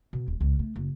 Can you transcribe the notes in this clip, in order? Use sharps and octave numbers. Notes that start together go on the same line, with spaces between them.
B2
D#1
C#2
A3
F#1